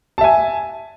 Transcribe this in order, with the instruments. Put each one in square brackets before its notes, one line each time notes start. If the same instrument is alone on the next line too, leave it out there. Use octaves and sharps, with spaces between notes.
[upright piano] A5
E5
G#5